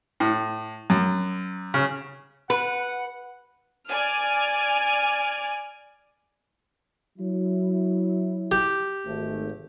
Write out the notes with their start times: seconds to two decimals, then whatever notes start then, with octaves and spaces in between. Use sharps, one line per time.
0.20 A2
0.90 F#2
1.74 C#3
2.50 B4 F#5
3.87 D5 G#5 F6
7.18 F#3 E4
8.52 G4
9.05 G#1 A3